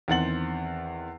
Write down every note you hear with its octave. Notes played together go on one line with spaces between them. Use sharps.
E2 D#3 C4 F#5 A6 F#7